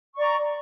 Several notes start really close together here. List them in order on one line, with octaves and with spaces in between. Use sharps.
C#6 D5 A#5